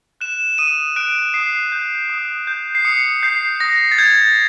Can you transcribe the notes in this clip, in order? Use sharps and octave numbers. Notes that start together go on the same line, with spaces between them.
F#6 E7
D#6 D#7
F#6 D7
D#6 C7
G6
D#6
G6
C7
D#6 C#7
G6 C7
D#6 A#6
A6
G6 G#6